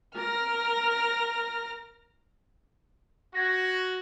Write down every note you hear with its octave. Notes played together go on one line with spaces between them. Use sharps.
A#4 F6 A#6
F#4 G#6 A#6